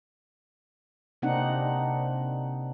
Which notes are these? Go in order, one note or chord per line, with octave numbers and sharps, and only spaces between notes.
C3 A#3 C4 D4 D#4 F#5